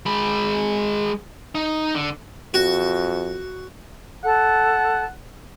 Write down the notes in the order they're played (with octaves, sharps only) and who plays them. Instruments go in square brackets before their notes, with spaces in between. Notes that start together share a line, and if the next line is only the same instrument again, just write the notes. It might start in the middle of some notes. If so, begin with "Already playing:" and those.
[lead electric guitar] G#3 B5
D#4
D3
[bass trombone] F2 [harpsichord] F#4
[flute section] A4 A5 [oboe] F#5